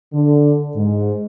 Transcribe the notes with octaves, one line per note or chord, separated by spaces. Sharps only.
D3
G#2